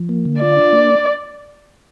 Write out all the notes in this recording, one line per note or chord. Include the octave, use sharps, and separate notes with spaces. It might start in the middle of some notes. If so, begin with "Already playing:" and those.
Already playing: F3
A#3
D3
F4 D5
D4
A#3